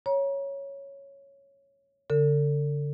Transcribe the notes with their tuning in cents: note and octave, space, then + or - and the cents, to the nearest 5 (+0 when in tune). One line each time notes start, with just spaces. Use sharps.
C#5 +0 A#5 +35
D3 -40 A4 +40